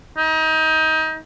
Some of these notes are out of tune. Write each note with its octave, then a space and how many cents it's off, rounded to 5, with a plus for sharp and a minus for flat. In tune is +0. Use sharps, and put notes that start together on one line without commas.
D#4 +25